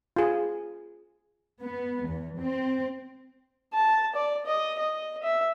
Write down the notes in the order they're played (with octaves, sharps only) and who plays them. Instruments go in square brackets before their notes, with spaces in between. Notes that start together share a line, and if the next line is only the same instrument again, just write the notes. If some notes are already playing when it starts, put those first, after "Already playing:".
[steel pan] F4 G#4
[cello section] B3
E2
C4
[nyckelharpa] A5
D5
D#5
D#5
E5